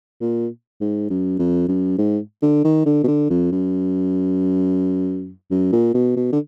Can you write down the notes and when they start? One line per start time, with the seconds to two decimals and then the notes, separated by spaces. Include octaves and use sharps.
0.21 A#2
0.81 G#2
1.10 F#2
1.39 F2
1.68 F#2
1.98 G#2
2.42 D3
2.64 D#3
2.86 D3
3.04 B2
3.07 D3
3.30 F2
3.52 F#2
5.51 F#2
5.72 A#2
5.94 B2
6.16 B2
6.32 D3